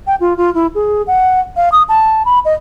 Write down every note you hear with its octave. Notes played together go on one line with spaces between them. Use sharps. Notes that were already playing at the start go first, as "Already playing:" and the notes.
G5
F4
F4
E4
G#4
F#5
F5
D#6
A5
B5
D#5